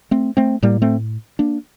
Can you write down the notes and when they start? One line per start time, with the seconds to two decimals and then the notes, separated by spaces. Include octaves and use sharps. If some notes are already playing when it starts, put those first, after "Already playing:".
0.11 A3 C4
0.37 A3 C4
0.62 A2 G3 A#3
0.82 A3 C4
1.39 A#3 D4